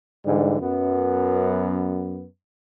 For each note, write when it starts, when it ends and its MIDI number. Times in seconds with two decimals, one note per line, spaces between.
0.26 0.58 44
0.26 0.58 50
0.26 0.58 52
0.26 0.58 55
0.61 2.24 42
0.61 2.24 59